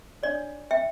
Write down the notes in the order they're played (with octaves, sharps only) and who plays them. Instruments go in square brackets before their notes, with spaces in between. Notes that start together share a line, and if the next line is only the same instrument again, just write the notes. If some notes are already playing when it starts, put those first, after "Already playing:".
[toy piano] D4 A4 C#5 D5
E5 G5